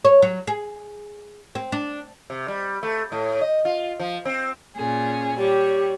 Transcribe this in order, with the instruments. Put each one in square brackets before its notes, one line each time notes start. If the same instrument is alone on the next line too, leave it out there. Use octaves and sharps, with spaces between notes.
[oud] C#5
F#3
G#4
C4
D4
[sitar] C3
G3
A3
A2
D#5
F4
F3
C4
[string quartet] A#2 C#4 G#4
[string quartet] G3 C#5 [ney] G4